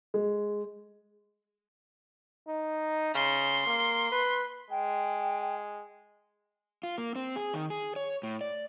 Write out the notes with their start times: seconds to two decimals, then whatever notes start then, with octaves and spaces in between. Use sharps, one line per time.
0.14 G#3
2.48 D#4
3.14 C#3 C6
3.66 A#3
4.12 B4
4.71 G#3 G5
6.83 F4
6.98 A#3
7.16 C4
7.36 G#4
7.54 D#3
7.70 G#4
7.96 C#5
8.23 A2
8.41 D5